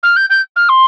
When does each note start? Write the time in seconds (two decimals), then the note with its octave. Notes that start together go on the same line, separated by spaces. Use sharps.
0.03 F6
0.16 G6
0.30 G6
0.56 F6
0.69 C6